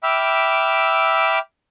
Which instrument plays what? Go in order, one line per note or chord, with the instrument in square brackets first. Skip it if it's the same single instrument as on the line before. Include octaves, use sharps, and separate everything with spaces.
[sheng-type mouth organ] E5 G5 B5 D6 E6 F6